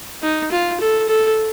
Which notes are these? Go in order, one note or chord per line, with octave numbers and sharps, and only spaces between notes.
D#4
F4
A4
A4